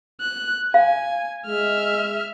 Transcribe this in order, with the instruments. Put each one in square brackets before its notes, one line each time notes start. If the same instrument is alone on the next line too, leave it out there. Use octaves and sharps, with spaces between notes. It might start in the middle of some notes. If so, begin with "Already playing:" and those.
[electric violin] F#6
[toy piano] F5 [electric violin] G#5
[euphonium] G#3 [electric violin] E5 F6